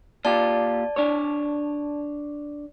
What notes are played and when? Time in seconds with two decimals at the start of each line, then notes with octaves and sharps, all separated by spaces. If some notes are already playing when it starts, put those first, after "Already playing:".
0.25 A#2 F4 G4 D5 A5
0.96 D4 C#5